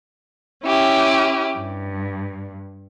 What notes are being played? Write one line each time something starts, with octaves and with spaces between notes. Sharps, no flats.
C#4 E4 G4
G2